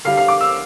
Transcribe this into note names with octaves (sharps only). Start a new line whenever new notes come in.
D3 G3 F5
F5
D6
E6